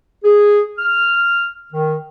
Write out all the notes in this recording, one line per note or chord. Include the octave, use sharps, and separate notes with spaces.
G#4
F6
D#3